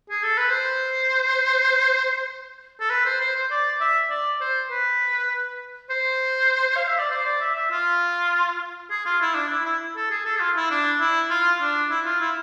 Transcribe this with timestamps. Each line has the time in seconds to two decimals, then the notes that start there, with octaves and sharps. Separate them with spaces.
0.10 G#4
0.23 A4
0.37 B4
0.50 C5
2.80 A4
2.90 B4
3.05 C5
3.21 C5
3.35 C5
3.51 D5
3.81 E5
4.10 D5
4.41 C5
4.70 B4
5.90 C5
6.76 F5
6.88 E5
6.99 D5
7.10 C5
7.25 D5
7.41 E5
7.55 E5
7.71 F4
8.90 G#4
9.05 F4
9.21 E4
9.35 D4
9.51 E4
9.65 E4
9.96 A4
10.10 G#4
10.25 A4
10.36 G#4
10.40 F4
10.56 E4
10.71 D4
11.00 E4
11.30 F4
11.61 D4
11.90 E4
12.05 F4
12.20 E4